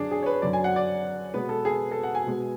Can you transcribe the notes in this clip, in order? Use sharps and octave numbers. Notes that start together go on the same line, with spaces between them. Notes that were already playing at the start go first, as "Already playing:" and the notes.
Already playing: F#2 D3 F#3 D4 G#4
G#4
C#5
B4
F#2 D3 F#3 D5
G#5
F#5
D5
B2 G#3 B3 B4
A4
G#4
A4
F#5
G#5
B2 G#3 B3